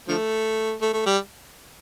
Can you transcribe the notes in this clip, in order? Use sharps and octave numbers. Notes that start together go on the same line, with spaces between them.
D3 F3 A3
A3
A3
G3